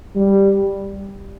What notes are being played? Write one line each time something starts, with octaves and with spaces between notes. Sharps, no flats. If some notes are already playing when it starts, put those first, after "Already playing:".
G3